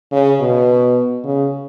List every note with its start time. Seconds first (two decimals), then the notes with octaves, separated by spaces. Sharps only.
0.12 C#3
0.40 B2
1.24 C#3